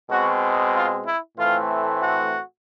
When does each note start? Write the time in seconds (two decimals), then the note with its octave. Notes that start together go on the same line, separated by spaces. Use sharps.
0.10 B2 G#3 C4 F#4
0.74 F4
1.07 E4
1.38 A2 E3 A3 C4 F4
2.02 F#4